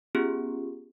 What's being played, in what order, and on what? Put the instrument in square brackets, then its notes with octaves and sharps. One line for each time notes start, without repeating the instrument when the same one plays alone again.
[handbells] B3 C#4 F4 G4 G#4